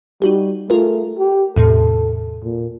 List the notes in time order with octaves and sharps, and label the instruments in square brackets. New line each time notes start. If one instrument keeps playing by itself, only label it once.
[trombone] G3 [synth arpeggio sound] D#4 F#4 G4
[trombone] A3 [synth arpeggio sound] F4 G#4 A#4
[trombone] G4
[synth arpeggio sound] E2 A2 C3 [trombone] A4
[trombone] A#2